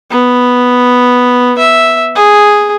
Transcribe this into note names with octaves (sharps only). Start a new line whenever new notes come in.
B3
E5
G#4